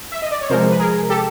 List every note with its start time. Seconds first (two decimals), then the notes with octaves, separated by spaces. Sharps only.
0.12 E5
0.22 D#5
0.31 D5
0.41 C#5
0.49 C3 F3 G#3 A#4 C5
0.71 B4
0.79 G#4 A#4
1.09 G4 A4